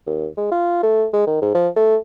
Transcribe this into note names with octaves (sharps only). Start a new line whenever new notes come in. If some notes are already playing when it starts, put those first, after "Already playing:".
D#2
G#3
F4
A3
G#3
D#3
G#2
F3
A3